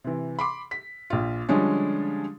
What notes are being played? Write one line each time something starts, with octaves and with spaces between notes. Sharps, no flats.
C3 E3
B5 C6 D6
B6
A#1 F4
D3 F3 G3 G#3 C#4 D4